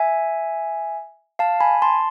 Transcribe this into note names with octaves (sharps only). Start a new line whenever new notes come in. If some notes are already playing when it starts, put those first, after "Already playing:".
Already playing: E5 G#5
F5 A5
G#5 B5
A5 C6